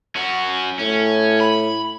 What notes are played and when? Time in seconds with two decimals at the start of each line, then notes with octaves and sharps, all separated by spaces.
0.16 C#4 F#4
0.79 A2 C#4
1.40 B5